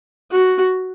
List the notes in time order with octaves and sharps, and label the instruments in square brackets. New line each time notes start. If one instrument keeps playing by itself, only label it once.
[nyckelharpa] F#4